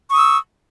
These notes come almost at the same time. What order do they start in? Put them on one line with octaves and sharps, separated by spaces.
C#6 D#6 E6